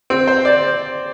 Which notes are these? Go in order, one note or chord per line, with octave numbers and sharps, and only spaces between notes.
C4
C5
D5